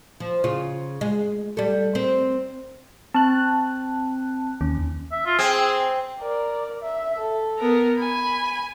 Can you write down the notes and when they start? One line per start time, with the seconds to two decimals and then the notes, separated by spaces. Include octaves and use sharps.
0.20 F3
0.44 C#3 F4
1.01 G#3
1.57 G3 A4
1.95 C4 A#4
3.14 C4 A5 F#6
4.61 D#2 C#4
5.12 E5
5.26 F4
5.39 C4 G#4
6.21 A#4 D5
6.83 E5
7.17 A4
7.59 B3 A#4
7.99 G#5 B5